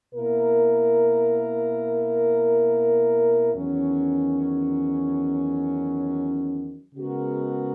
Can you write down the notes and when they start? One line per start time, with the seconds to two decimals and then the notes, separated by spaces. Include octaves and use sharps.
0.14 B2 A#3 E4 A#4
3.54 E2 D#3 F#3 C#4
6.95 C#3 G#3 B3 F#4 A#4